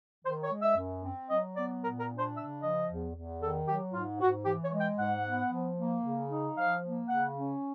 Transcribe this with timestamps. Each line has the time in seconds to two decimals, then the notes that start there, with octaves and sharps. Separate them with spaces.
0.25 D#3 C5
0.43 C#5
0.52 G#3
0.60 E5
0.78 F#2
1.04 C4
1.30 F#3 D#5
1.57 B3 D5
1.83 A#2 A#4
2.00 A#4
2.09 D4
2.18 C5
2.35 C#3 E5
2.61 F3 D#5
2.88 E2
3.14 E2
3.41 D#3 A4
3.66 F#3 G4
3.93 G#2 F4
4.20 G#2 F#4
4.45 E3 G4
4.63 C#5
4.72 G#3
4.81 G5
4.98 G#2 F#5
5.25 B3
5.50 F3
5.78 A#3
6.03 C#3
6.29 D#4
6.56 F3 F5
6.82 A#3
7.09 C#3 F#5
7.35 C#4